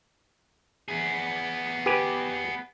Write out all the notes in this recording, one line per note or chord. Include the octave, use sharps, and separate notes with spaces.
B3 G#4
G4 B4 G#5